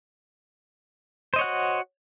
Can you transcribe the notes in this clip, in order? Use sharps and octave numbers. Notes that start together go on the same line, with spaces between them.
F#4 C5 C#5 D#5 F#5